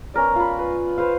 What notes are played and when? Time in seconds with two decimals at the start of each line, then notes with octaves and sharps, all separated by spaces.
0.14 B3 C#4 A#4 D5
0.36 F4 B5
0.59 B4
0.97 B4 C5 F5